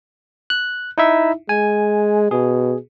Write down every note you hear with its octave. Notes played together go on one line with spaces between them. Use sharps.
F#6
D#4 E4 E5
G#3 G#5
B2 G#4